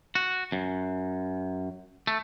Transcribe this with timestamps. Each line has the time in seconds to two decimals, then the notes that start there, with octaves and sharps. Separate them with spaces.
0.15 F#4
0.52 F#2
2.07 A3